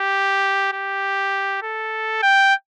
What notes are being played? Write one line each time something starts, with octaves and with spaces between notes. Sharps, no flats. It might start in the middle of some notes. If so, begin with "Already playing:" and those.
Already playing: G4
G4
A4
G5